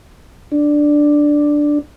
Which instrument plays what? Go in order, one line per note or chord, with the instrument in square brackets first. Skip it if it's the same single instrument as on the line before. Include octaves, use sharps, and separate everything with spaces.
[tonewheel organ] D4